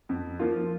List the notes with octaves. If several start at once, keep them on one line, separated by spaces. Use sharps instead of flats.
F2
F3 A#3 F4